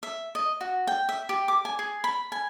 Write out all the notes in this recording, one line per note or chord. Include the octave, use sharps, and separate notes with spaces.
E5
D#5
F#4
G5
E5
G4
D6
G#5
G#4
B5
G#5